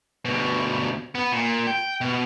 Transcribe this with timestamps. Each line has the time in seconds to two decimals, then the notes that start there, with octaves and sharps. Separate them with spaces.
0.25 D2 B2
1.15 B3
1.32 A#2
1.67 G5
2.01 B2